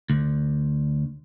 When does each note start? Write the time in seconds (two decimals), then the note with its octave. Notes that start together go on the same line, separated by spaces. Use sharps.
0.10 D2